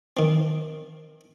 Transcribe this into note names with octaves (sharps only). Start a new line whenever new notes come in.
D#3 C4